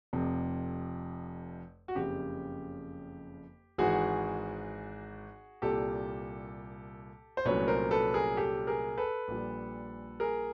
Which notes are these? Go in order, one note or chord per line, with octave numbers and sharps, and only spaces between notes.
F1 F2 C3
F#4
F#1 F2 C#3 G4
G#1 G#2 E3 F#4 G#4
C2 A#2 G3 A#3 G4 A4
C5
C2 A#2 F#3 A3 C#4 B4 C#5
A#4 C5
A4 B4
G#4 A#4
G4 A4
G#4 A#4
A4 B4
A#1 A#2 G3
G#4 A#4